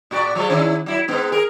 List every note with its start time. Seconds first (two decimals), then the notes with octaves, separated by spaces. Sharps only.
0.11 A2 F#4 D5
0.35 F3 F#3 G#3
0.50 D#3 C#4 E4
0.86 F#3 E4
1.08 G#2 B3 D#4
1.32 G#4 A#4